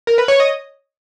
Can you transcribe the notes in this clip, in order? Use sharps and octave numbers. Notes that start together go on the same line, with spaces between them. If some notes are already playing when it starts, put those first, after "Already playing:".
A#4
B4
C#5
D#5